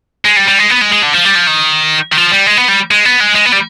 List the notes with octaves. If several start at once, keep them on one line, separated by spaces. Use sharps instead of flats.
G#3
G3
G3
G#3
B3
G#3
G#3
D3
F3
G3
F3
D#3
D#3
F3
G3
G#3
B3
G3
G#3
B3
G#3
G#3
B3
G3